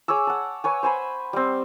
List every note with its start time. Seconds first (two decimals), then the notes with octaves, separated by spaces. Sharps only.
0.08 G#4 C#5 D6 E6
0.27 F#5 A5
0.64 B4 C#5 G#5
0.83 C5 G#5 B5
1.33 G3 C4